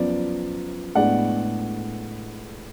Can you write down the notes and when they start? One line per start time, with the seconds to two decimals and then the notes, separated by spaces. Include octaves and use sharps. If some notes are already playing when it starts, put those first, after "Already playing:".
Already playing: F#2 F3 B3 D5
0.95 A2 G#3 B3 D4 D5 F#5